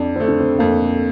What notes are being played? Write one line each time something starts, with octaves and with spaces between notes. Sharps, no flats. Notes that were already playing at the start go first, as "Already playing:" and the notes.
Already playing: F2 D4
D3 A3 C4
D4
C4
F2 A#3